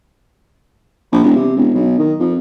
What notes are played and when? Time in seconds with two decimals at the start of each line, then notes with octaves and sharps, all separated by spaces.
1.12 A#1
1.23 E1
1.36 C3
1.56 E1
1.74 B1
1.99 D#3
2.20 F2